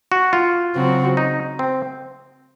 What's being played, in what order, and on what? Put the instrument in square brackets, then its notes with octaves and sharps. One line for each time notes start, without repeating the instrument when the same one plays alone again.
[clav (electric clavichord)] F#4
F4
[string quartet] C#3 F#3 C4 F#4
[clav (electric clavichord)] D#4
C4